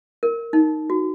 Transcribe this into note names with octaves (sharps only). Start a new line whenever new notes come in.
A#4
D#4
F#4